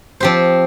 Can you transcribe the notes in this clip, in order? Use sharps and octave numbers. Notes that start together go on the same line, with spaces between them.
F3 C4 G4 C5